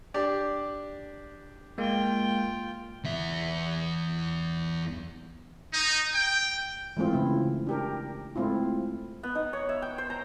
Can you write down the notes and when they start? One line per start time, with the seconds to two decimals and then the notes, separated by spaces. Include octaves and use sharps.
0.14 D4 G4 D5
1.78 G#3 A#3 F4 G5
3.04 E2 E5
5.73 D#4
6.15 G5
6.97 E3 G#3 A3 C4 F4
7.13 C#3 E4
7.67 D4 G4 A#4
8.36 G#3 A3 C4 E4 F4
9.23 B3
9.35 D#4
9.53 C#5
9.69 E5
9.82 G5
9.98 C5
10.10 A#5